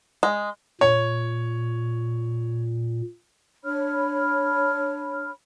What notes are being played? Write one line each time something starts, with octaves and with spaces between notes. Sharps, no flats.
G#3
A#2 C#5
D4 C#5 B5 F6